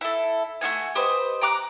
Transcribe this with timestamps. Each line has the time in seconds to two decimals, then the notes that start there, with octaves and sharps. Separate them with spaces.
0.01 E4 A4
0.61 A3 D4 F#4 G#5
0.95 G4 B4 C5 D#5
1.41 G5 A#5 D6 F#6